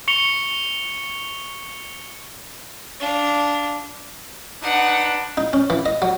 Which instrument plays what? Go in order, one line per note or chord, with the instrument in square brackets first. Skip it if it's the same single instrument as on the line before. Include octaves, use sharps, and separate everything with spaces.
[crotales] C#6 C#7 F7 G7
[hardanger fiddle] D4 F5
[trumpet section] D4 D#4 B4 [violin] F#5
[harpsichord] D#4
C#4
E3
D#5
F#3